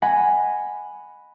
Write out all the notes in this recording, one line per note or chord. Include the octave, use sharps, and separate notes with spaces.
D#5 F#5 G#5 B5